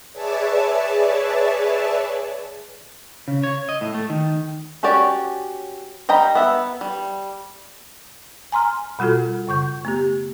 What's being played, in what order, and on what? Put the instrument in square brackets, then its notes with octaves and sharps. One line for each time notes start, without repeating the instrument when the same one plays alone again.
[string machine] G#4 B4 C#5 D5 E5 A5
[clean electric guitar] C#3
C#5
D#5
A2
A3
D#3
[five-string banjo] C#4 F#4 G4 C#5 D5
G3 D#5 G5 A#5 B5
B3 E5
G3
[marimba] G#5 A#5 C6 F6
B2 G3 F4 F#4 A4
F#2 C#3 C#6 G6
A3 B3 G4